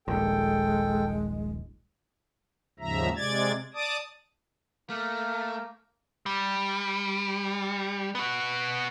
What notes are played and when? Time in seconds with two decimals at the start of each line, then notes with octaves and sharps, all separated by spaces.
0.08 D#1 A#1 G#3 A4 G5
2.80 D#2 G#2 C#3 F3 E5 A#5
3.16 C3 G#3 D5 G#6 A6
3.74 D5 A5 D6 D#6
4.90 A3 A#3 F6
6.26 G3
8.15 B3 F#4